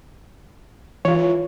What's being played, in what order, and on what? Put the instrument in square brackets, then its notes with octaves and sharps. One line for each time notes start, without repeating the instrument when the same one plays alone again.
[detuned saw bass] E3 [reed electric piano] F4 C#5